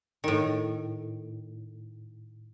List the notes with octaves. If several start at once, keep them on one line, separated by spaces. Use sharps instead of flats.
A2 D#3